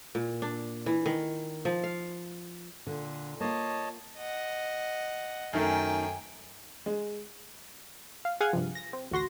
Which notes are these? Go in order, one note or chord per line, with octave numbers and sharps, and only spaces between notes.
A#2
D4
E3
D#3
F3
F5
A#2 D3
A#3 F4 C#5 D#5 A5
D#5 F#5
F#2 D#3 A3 G5 G#5
G#3
F5
G#4 F5 F#5 G#5 G#6
G2 C3 F3
A#6
C4
A1 D2 F#4 C6 A#6